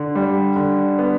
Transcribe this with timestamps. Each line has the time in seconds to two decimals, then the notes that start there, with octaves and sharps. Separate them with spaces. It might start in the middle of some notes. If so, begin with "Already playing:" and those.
Already playing: D3
0.15 G3
0.56 D3
0.99 B3